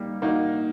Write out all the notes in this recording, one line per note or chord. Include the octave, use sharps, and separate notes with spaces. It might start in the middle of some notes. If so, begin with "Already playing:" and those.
Already playing: G3 A#3 D#4
A#3 D#4 F#4